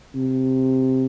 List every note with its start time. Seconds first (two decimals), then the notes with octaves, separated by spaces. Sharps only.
0.15 C3